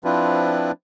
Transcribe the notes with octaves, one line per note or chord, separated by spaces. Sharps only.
F3 C4 D4 E4 F4 B4